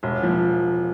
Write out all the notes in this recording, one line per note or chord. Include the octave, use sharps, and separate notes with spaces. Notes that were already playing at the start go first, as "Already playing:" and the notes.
E1
F3